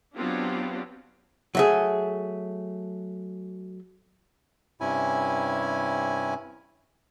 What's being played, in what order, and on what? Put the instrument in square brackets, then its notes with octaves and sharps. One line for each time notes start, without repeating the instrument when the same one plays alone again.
[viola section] F#3 B3 C4 D4 F4 G4
[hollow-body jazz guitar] F#3 A3 G#4
[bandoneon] G2 C3 C#4 E4 G#5